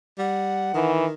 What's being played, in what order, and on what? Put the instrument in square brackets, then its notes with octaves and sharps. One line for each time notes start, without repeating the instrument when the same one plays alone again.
[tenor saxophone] G3 [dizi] F#5
[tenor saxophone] D#3 [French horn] E3